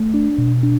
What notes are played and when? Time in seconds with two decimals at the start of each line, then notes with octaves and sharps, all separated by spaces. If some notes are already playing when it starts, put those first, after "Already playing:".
Already playing: A3
0.14 D4
0.38 B2
0.63 D4